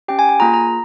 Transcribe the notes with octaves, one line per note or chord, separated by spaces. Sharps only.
C#4 G4 G5
G#5
G#5
A#3 F4 G#4 A#5
A#5